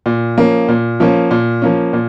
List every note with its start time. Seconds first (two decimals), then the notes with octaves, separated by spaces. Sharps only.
0.06 A#2
0.37 F3 A#3 C#4
0.68 A#2
1.00 F3 A#3 C#4
1.31 A#2
1.62 F3 A#3 C#4
1.93 A#2